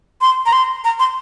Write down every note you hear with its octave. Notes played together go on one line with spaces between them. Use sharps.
C6
A#5
C6
A#5
C6